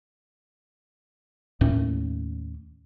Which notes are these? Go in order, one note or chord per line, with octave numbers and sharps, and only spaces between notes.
D#2 A2 C#4